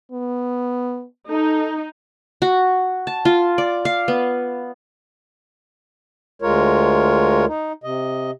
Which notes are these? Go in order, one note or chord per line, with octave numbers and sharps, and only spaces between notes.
B3
D#4 A4
F#4
A5
F4
D5
F5
B3
D2 G#3 F4 A#4 C#5
D#4
C3 D#5